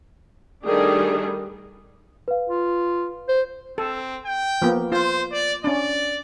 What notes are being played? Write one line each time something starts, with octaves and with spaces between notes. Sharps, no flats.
D#3 G3 A3 D4 G#4
B4 F5
F4
C5
C4 A4
G5
F3 A#3 B3
F4 C5
D5
C#4 D4 D5